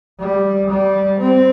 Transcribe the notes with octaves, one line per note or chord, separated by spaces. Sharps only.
G3
G3
C4